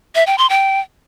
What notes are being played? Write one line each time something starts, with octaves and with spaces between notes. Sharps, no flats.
E5
G5
C6
G5